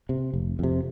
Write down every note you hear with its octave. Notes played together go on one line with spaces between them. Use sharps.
C3
F1
F2 C3